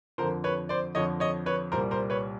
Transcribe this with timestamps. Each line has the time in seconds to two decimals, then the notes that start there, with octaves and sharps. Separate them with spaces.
0.18 F2 D3 F3 A#4 C5
0.44 B4 C#5
0.69 C5 D5
0.95 F2 D3 F3 C#5 D#5
1.20 C#5 D#5
1.46 B4 C#5
1.72 C2 A#2 G3 A#4 C5
1.91 A#4 C5
2.10 B4 C#5